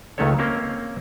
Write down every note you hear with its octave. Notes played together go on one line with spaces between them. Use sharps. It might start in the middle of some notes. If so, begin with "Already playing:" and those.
C#2 D#3 A3 C#4 A4 C#5
A#3 C4 C#4 A#4 C5 F5